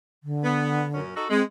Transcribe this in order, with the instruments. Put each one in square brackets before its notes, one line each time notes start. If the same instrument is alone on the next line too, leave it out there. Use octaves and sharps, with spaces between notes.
[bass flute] D3
[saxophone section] B3
F#2 A#2 C#4
D#4 F#4 A4
[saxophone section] G#3 [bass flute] C4